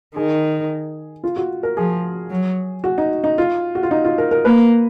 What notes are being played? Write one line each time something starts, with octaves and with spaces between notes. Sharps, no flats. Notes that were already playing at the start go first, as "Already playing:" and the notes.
D#3 G#4
F4
F#4
A#4
F3 G#4
F#3
F#4
D#4
D#4
F4
F#4
F4
D#4
F4
A#4
A#4
A#3 B4